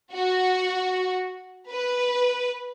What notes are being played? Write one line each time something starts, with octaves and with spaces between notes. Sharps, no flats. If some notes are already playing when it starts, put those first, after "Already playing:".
F#4
B4